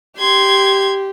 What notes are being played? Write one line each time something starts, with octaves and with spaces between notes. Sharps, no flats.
G4 C6 G#6